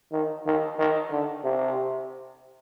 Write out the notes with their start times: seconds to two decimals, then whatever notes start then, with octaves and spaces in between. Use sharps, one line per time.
0.12 D#3
0.46 D#3
0.79 D#3
1.11 D3
1.44 C3